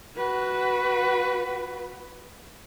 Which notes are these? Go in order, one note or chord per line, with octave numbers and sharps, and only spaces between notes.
F#4 B4